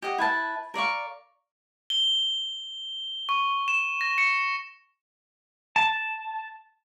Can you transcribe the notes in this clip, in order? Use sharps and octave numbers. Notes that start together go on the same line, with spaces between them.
G4 D#5 F#5
E4 B4 A5
A#4 D5 F5 C#6
G7
C#6
E7
A#6
C#7
A5